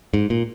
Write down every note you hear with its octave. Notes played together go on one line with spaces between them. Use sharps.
G#2
A#2